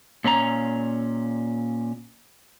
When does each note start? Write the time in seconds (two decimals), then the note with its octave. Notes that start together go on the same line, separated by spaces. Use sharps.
0.24 A#2 C#4 D4 A#5